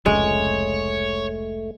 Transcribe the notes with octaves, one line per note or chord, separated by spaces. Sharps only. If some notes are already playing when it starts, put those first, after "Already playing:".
F1 C#2 G#3 A3 C#5